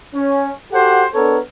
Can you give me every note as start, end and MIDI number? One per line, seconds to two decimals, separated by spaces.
0.14 0.50 61
0.72 1.04 66
0.72 1.04 67
0.72 1.04 69
0.72 1.04 72
0.72 1.04 78
1.13 1.38 59
1.13 1.38 62
1.13 1.38 69
1.13 1.38 70
1.13 1.38 73